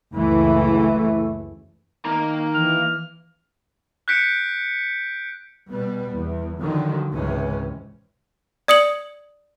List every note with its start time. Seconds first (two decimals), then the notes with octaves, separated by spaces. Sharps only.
0.13 F#1 C#2 E3 A3
2.05 D#3 A#3 A#5
2.54 E3 F6
4.08 F#6 G6 B6 C#7 D7
5.70 B2 G3 B3
6.15 E2
6.61 D3 D#3 F3 F#3
7.12 C#2 G#2 C3 E3 C#4
8.68 D5 D#6 C#7 F#7